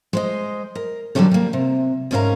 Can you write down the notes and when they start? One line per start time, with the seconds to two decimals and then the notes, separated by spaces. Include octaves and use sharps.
0.13 G#3 C5 D#5
0.75 A#4
1.15 D3 D#3 F#3 G3 C#4 A4
1.31 G3 A#3
1.53 C3
2.11 D2 G#2 C#4 A#4 F5 A#5